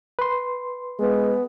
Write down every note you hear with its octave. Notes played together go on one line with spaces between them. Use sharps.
B4 C6
G#3 B3